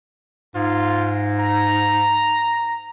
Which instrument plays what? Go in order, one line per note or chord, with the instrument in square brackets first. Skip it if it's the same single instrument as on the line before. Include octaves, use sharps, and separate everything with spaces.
[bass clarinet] G#2 [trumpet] F4
[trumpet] A#5